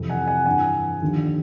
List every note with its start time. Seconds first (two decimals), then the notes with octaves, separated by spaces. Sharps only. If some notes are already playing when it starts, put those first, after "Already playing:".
Already playing: F2 C3 E3
0.09 F#5 G#5
0.27 F#5 G#5
0.46 G2 E3 F#5 G#5
1.02 D#2 D3 F3